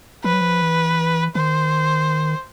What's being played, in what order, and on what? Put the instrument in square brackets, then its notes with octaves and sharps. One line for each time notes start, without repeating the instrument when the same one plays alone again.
[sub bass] F3 [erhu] B4
[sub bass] F#3
F3
E3
[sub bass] D#3 [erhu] C5